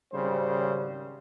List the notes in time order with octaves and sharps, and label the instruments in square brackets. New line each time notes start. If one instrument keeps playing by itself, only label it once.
[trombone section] G#1 C#3 G3 C5